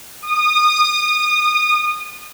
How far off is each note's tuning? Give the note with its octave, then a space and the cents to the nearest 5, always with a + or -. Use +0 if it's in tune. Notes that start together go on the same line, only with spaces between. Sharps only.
D#6 -25